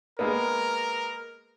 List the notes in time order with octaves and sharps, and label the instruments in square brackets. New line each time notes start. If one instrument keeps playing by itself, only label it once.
[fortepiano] G#3 A#3 B3 [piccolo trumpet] A#4